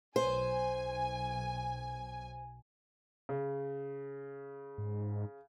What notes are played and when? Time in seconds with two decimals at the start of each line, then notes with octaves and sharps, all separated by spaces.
0.16 B1 C5 G#5
3.29 C#3
4.78 G#2